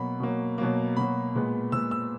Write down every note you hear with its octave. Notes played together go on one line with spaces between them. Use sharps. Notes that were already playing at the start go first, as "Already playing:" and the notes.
Already playing: B2 F#3 A#3 B5
B2 F#3 A#3
B2 F#3 A#3
B2 F#3 A#3 B5
A#2 G#3 B3
A#2 G#3 B3 E6
E6